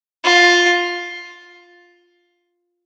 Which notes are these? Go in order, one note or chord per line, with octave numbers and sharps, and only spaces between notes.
F4